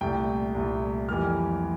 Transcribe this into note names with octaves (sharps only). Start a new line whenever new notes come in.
C2 A#2 A3 G5
C2 A#2 A3
F2 E3 G3 A#3 F6